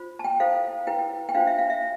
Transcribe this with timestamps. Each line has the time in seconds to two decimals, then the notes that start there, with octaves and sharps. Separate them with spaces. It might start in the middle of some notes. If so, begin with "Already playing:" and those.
Already playing: F4 C5
0.19 A5
0.24 G5
0.40 E4 A4 C5 F5
0.87 E4 B4 G5
1.29 G5
1.35 D4 F4 C5 F5
1.47 E5
1.58 F5
1.70 E5